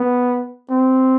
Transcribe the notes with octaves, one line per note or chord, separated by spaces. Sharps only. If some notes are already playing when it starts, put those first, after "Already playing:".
Already playing: B3
C4